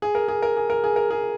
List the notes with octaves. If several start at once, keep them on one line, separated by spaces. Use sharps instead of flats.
G#4
A#4
G#4
A#4
G#4
A#4
G#4
A#4
G#4